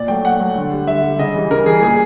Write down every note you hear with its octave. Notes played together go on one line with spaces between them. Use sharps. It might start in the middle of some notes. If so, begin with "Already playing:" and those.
Already playing: A#2 D5
F#3 A3 G5
A#2 F#5
F#3 A3
D3
G3
D3 E5
G3
C#3 D#5
E3 G3
C#3 A#4
E3 G3 G#4
A#2 G#4